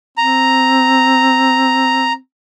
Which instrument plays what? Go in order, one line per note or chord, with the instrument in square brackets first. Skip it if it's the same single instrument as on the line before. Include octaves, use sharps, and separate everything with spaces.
[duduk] C4 [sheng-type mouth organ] A#5